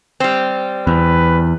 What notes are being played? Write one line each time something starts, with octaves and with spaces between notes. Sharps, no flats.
G3 C4
E2 B4